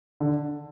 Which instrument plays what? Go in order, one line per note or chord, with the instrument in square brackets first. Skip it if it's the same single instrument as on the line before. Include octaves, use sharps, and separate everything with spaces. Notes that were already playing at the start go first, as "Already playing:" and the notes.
[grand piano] D3